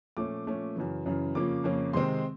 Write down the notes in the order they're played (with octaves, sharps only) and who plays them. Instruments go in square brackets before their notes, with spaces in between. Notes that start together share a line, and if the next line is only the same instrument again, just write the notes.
[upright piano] A#2 F3 A3 C#4 D6
A#2 F3 A3 C#4
F#2 C#3 E3
F#2 C#3 E3
F2 C#3 F3 A#3 C#4 D6
F2 C#3 F3 A#3 C#4
C3 D#3 G#3 C4 C6